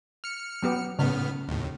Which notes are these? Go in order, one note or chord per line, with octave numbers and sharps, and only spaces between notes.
F6 C#7
F#3 B3 G4
A2 C#3 B3 F6
D#2 A2